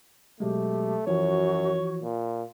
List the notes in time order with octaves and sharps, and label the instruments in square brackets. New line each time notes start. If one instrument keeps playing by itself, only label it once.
[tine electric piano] B2 F#3 G#3 [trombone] A3 [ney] G4
[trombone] F#2 [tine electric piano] E3 F3 [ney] F#4 [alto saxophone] C#5
[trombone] A#2